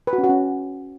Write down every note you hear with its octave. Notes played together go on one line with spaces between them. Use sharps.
B4
F#4
C#4
F#4
C#4